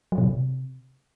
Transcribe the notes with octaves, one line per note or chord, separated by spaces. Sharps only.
F#3
B2
C3